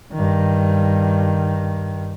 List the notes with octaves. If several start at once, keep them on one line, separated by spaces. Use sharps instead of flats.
G2 D#3